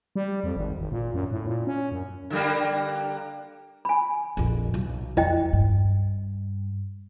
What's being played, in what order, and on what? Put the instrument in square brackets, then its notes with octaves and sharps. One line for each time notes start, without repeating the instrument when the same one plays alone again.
[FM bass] G3
F2
G#1
G#1
A#2
F#2
A2
A#2
C#4
F#2
[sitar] D3 G3 A#3
[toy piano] G#5 B5
[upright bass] A#1 F2
B1 F#3
[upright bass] F2 [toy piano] E4 D#5 G5
[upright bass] G2